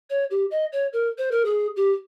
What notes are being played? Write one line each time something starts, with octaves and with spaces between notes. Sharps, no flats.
C#5
G4
D#5
C#5
A#4
C5
A#4
G#4
G4